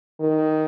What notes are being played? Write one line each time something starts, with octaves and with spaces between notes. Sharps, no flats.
D#3